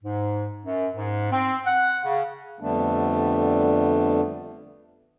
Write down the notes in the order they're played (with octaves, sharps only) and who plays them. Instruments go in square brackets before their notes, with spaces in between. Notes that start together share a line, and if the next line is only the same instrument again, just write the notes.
[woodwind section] G#2
F#2
G#2
C4
F#5
C#3
[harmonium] F2 D3 G3 A3 B3 D4